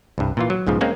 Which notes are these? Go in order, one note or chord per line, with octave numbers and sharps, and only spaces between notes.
C2 G2
A#2 E3 F4
F#3
B1 G#2 C#3 F3
G#3 A#3 C4 C#4